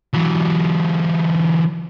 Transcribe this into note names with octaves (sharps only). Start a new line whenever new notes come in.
E3 F#3